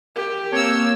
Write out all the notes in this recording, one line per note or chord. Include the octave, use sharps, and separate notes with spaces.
G4 A#4
A#3 C4 C#5 E6